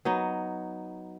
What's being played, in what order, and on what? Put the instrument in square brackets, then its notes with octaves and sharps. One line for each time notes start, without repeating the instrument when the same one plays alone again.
[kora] F#3 B3 D#4